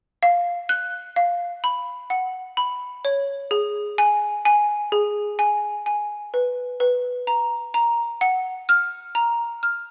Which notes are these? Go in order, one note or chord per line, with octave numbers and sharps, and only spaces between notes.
F5
F#6
F5
B5
F#5
B5
C#5
G#4
G#5
G#5
G#4
G#5
G#5
B4
B4
A#5
A#5
F#5
F6
A#5
F6